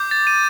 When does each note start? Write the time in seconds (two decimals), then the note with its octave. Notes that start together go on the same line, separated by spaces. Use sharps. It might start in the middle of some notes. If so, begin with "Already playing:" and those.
Already playing: D6 G6
0.11 A6
0.27 D#7